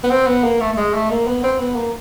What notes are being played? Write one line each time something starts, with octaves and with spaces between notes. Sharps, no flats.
B3
C4
B3
A#3
A3
A3
G#3
A3
A#3
B3
C4
B3
A#3